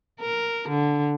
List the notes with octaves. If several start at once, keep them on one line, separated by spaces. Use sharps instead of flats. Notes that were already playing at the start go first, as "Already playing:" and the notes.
A#4
D3